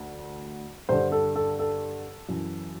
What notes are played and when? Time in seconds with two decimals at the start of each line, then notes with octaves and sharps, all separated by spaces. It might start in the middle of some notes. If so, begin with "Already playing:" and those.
Already playing: D2 D3
0.89 G2 D3 C5
1.12 A4
1.35 A4
1.59 A4
2.29 F#2 E3